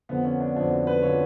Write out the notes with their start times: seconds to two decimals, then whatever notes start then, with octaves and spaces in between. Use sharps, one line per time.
0.09 F2 D3 F3 B3
0.25 C#4
0.40 D4
0.56 F2 D3 F3 D4
0.71 F#4
0.87 B4
1.02 D3 F3 C#5